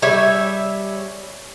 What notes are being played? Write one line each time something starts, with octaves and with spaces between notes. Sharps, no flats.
G3 C#5 E5 G#5